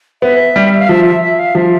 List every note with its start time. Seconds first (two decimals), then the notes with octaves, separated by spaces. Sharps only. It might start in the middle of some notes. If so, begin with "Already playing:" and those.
0.22 B3 E5
0.56 G3
0.80 F5
0.89 F3 E5
1.05 E5
1.22 E5
1.39 F5
1.55 F3 E5